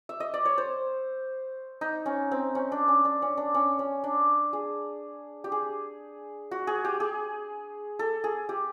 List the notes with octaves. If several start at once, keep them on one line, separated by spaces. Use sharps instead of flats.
E5
D#5
D5
C#5
C5
D#4
C#4
C4
C#4
D4
C#4
D4
C#4
D4
C#4
C#4
D4
G#4
G4
G#4
F#4
G#4
G4
G#4
A4
G#4
G4